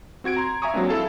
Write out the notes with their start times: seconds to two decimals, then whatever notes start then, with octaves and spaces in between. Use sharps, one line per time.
0.24 C4 F#4 G#6 D7
0.37 A#5 C6
0.62 E5 F5 G#5 A#5 C#6 D#6
0.74 F#3 G#3 A#3 C4 D4
0.89 E4 G#4 A4 F5 A5